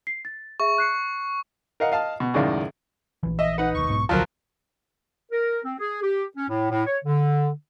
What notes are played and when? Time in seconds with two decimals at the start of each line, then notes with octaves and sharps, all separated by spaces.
0.07 C7
0.25 A6
0.60 G#4 E5 C#6
0.78 F#6 C7 C#7
1.80 A#4 D#5 F5 F#5
1.92 D#5 F5 A5
2.20 B2
2.34 C#2 F#2 A2 D#3 D5 F5
3.23 A#1 E3
3.39 D#5 E5
3.58 D#4 B4 F#5
3.75 E1 D#2 C#6
3.89 B1 G#2 B3
4.09 D#1 C2 D3 F3 F#3 A#4
5.32 A#4
5.65 C4
5.79 G#4
6.03 G4
6.37 C#4
6.49 A2
6.71 A2
6.86 C#5
7.05 D3